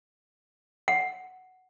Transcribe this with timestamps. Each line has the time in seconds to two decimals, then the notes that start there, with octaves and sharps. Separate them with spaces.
0.88 F#5